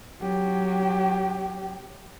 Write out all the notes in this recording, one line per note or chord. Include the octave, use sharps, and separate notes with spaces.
F#3 G4